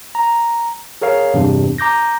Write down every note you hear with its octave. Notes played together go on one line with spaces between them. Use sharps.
A#5
G#4 A#4 C#5 F5
E2 G2 C3 D4
A#5 D6 G6 A#6